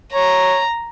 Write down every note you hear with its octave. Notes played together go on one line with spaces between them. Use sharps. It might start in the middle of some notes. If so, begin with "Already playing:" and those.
C#5 A#5